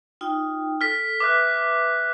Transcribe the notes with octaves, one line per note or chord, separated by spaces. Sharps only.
D#4 F4 G5
A4 F6 B6
B4 E5 D6 F6 F#6